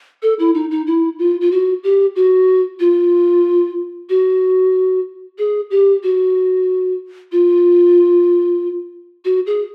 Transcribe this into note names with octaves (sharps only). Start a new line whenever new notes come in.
A4
E4
D#4
D#4
E4
F4
F4
F#4
G4
F#4
F4
F#4
G#4
G4
F#4
F4
F#4
G#4